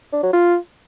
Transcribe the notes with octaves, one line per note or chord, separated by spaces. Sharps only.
D4
F#3
F4